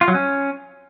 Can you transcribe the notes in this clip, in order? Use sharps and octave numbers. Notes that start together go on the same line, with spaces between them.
F4
F#3
C#4